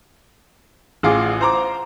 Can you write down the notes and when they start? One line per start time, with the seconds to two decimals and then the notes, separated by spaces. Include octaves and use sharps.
1.03 A1 F4 G#4 D6
1.41 C5 A#5 D6